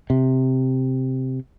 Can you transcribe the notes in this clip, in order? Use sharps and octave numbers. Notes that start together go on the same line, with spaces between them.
C3